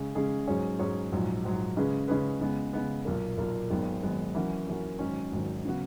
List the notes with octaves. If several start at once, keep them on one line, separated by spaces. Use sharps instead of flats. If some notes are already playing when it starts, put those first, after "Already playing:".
Already playing: C#3 G#3 C#4 G#4
C#3 G#3 C#4 G#4
G#2 F#3 C#4 G#4 C#5
G#2 F#3 C#4 G#4 C#5
A#1 G#2 F#3
A#1 G#2 F#3
C#3 G#3 C#4 G#4 B4
C#3 G#3 C#4 G#4 B4
C#3 G#3 B3
C#3 G#3 B3
B1 A#2 A#3
B1 A#2 A#3
G#1 F#2 D#3 G#3 B3
G#1 F#2 D#3 G#3 B3
F#2 E3 A#3 C#4 F#4
F#2 E3 A#3 C#4 F#4
G#1 G#2 D#3 F#3 C#4
G#1 G#2 D#3 F#3 C#4
C#3 F#3 B3 F#4